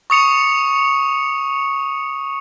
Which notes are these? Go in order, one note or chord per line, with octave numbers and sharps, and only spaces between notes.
C#6 D#6 C#7 F7